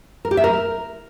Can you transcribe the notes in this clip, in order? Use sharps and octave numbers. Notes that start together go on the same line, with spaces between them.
A#4
G4
E5
A#4